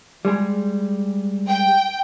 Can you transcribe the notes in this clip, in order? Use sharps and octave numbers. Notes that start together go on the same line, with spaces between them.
G3 G#3 G#4
G5